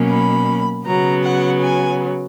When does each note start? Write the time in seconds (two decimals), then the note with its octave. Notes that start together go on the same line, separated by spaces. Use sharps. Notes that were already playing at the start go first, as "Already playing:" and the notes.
Already playing: B2 F#3 A#3 C#4
0.10 B5
0.86 C#3 F#3 B3 A#5
1.24 F#5
1.61 G#5